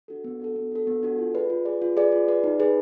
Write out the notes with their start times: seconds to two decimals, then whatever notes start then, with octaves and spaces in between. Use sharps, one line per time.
0.08 D4 F#4 A4
0.24 B3
0.40 D4 F#4 A4
0.56 B3
0.72 D4 F#4 A4
0.87 B3
1.03 D4 F#4 A4
1.18 F4
1.34 G#4 B4 D5
1.50 F4
1.65 G#4 B4 D5
1.82 F4
1.97 G#4 B4 D5
2.12 F4
2.28 G#4 B4 D5
2.44 D#4
2.60 G#4 B4